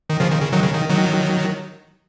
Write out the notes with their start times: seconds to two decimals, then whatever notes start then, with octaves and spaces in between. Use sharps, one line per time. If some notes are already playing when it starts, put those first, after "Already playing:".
0.10 D#3
0.20 C#3 F3
0.31 D#3
0.41 C#3
0.52 D#3 F#3
0.63 C#3
0.74 D#3
0.90 D#3 F#3